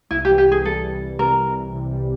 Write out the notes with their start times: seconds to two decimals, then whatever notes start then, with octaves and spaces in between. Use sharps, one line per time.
0.11 C2 E4
0.25 G4
0.29 E3
0.38 G4
0.47 C2 G#4
0.65 G3 A4
0.83 E3
1.02 C2
1.19 C3 A#4
1.38 G3
1.56 E3
1.74 C3
1.92 G3